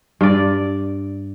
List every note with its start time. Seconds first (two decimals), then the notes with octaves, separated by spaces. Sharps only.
0.21 G2 D5